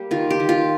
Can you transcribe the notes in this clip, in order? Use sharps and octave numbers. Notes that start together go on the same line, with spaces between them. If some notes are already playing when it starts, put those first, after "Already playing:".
Already playing: G3 A#3 G4
D#3 F4
G4
D#3
F4